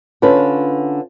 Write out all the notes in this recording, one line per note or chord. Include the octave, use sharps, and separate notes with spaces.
D3 C#4 F4 B4